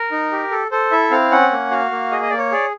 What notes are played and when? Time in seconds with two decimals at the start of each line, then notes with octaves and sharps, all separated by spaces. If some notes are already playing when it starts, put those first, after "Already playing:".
Already playing: A#4
0.12 D#4
0.32 G4
0.51 A4
0.71 A4 C5
0.91 E4 E5
1.11 C4 F5
1.31 C#4 F#5
1.51 A#3
1.71 F#4 F5
1.91 A#3
2.11 G#4 D#5
2.22 D#5
2.30 A#3 D5
2.38 C#5
2.52 G#4 D5